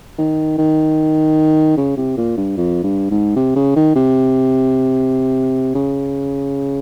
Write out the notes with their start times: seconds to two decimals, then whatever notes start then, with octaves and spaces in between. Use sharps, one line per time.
0.18 D#3
0.58 D#3
1.77 C#3
1.97 C3
2.17 A#2
2.37 G2
2.57 F2
2.83 G2
3.10 G#2
3.36 C3
3.56 C#3
3.76 D#3
3.95 C3
5.75 C#3